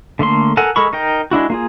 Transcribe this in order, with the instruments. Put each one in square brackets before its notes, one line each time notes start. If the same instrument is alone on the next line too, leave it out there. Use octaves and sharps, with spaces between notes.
[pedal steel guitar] D3 A3 A#3 C6
A4 A#4 F#5 G#5
G#3 A4 A#4 B5 C#6
D#4 A#4 G5
G#3 D4 E4 F#4
A#3 F4 G#4